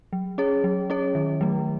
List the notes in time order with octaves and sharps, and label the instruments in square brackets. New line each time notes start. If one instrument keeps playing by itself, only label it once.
[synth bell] F#3
C#4 G#4 C#5
F#3
C#4 G#4 C#5
D#3
F#3 A3